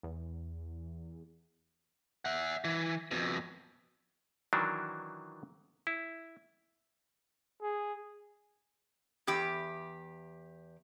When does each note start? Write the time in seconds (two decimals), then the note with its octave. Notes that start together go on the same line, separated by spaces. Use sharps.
0.03 E2
2.25 E5 F#5
2.64 E3
3.11 F2 B2
4.53 D#3 E3 F#3 D4
5.87 E4
7.62 G#4
9.27 E2 G4